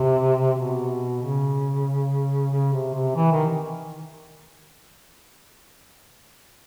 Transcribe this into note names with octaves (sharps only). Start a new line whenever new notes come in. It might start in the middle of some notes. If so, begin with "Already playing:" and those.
Already playing: C3
B2
C#3
C#3
C3
C3
E3
D#3